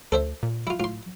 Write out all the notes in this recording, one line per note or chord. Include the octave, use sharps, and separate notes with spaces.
D2 A4 C5 E5
A#2
E4 F4
A2 F4 C6